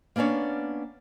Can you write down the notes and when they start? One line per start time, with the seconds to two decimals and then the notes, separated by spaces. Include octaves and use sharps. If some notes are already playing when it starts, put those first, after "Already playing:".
0.16 A#3 B3 C#4 D4 C#5